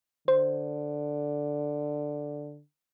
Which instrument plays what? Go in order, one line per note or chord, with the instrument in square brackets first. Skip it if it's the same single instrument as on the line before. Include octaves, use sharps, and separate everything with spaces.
[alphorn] D3 [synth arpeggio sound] C5